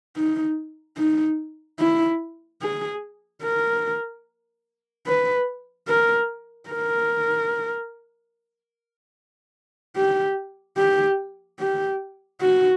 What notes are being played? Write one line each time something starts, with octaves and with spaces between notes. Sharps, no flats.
D#4
D#4
E4
G#4
A#4
B4
A#4
A#4
G4
G4
G4
F#4